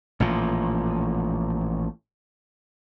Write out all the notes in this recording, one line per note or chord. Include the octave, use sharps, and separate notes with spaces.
A1 A#2 F3